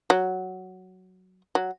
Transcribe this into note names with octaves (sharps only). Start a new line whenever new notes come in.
F#3
F#3